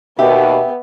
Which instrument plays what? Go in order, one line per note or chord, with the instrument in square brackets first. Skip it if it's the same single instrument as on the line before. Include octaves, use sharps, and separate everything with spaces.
[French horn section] D#2 B2 [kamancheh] B3 [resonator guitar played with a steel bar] G4 [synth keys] E5